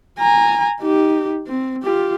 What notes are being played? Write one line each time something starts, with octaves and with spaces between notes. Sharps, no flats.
G#5 A#5
D#4 G4
C4
F4 G4